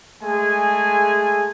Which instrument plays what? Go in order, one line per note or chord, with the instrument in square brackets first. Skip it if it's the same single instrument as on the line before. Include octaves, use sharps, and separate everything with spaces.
[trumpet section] G#3 A3 G#4 G#5